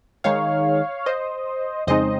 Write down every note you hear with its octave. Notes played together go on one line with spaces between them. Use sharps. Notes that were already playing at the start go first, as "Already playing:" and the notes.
D#3 G#3 D#4 C#5 F5
C5 D#5
F2 C#3 G#3 C4 D#4 C5 D#5